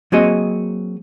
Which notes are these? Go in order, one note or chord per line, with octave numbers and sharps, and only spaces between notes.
F#3 A#3 C4 F#4 G#4 D#5